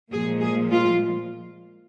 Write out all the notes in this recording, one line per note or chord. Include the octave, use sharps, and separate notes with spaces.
A#2 F3 G#3 G#4
G#4
F4